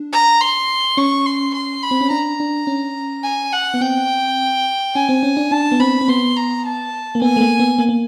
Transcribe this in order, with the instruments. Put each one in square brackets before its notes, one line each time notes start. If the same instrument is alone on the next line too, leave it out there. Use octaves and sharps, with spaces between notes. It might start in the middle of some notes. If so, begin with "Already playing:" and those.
Already playing: [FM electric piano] D4
[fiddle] A#5
C6
[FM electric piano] C#4 [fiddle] C#6
[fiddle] C6
C6
B5
[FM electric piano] C4
C#4
[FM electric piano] D4 [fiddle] A#5
[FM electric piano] D4
C#4
[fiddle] G#5
F#5
[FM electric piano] B3
[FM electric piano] C4 [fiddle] G5
[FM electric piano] C#4 [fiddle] G#5
[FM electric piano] C4
C#4
D4
[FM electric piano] D4 [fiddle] A5
[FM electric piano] B3
[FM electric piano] C4 [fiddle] B5
[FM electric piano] C4
[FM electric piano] B3 [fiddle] C6
[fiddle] A#5
A5
[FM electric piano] A#3
[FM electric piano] B3 [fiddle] G#5
[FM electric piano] A3
A#3
B3
A#3
A#3